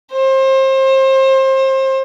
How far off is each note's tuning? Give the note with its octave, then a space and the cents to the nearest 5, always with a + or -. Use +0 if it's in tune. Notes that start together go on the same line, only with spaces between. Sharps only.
C5 +30